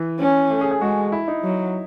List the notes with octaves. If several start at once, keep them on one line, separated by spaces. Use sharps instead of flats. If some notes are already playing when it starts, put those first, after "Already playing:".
Already playing: E3
C#4
A3
G#4
G#4
G#3 F#4
E4
D#4
F#3